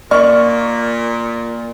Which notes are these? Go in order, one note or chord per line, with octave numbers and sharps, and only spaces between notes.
A#2 A#3 D5 C#6 F6